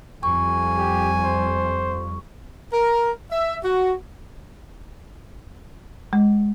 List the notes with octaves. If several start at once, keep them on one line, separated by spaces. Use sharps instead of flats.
F2 G3 G#5 C#6
G4
C5
A#4
E5
F#4
G#3